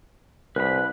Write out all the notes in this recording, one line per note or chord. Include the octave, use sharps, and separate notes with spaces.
C2 B4 B5